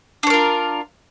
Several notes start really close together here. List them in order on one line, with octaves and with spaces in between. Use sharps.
D4 C#5 A#4 F4